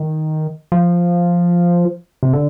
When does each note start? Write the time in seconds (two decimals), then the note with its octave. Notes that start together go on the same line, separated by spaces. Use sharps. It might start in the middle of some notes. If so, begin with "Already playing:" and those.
Already playing: D#3
0.72 F3
2.23 C3
2.33 D3